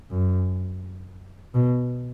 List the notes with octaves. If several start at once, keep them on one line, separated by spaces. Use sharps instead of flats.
F#2
B2